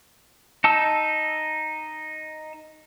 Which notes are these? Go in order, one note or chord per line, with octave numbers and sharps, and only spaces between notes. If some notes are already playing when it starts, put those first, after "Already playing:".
D#4 A5 E6